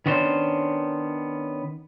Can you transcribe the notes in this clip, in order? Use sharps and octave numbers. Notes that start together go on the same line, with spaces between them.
D#3 B3 C#4 D4 C5